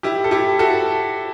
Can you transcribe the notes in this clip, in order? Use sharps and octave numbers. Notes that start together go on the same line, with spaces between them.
E4 G4
A4
E4 G4
F#4 A4